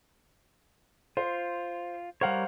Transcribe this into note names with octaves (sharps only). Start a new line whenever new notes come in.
F4 C5
G3 A#4 C5 C#5 F5 F#5